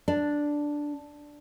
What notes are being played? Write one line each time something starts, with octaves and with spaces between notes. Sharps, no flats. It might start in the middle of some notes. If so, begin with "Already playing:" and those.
D4